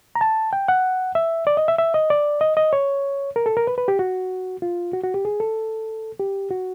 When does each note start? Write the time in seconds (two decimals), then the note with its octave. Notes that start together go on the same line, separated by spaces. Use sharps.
0.15 A#5
0.21 A5
0.53 G5
0.68 F#5
1.15 E5
1.47 D5
1.57 D#5
1.68 E5
1.78 E5
1.94 D#5
2.10 D5
2.41 D#5
2.57 D#5
2.73 C#5
3.36 A#4
3.46 A4
3.57 A#4
3.67 B4
3.78 B4
3.88 G4
3.99 F#4
4.62 F4
4.93 F#4
5.04 F#4
5.14 G4
5.25 G#4
5.40 A4
6.19 G4
6.51 F#4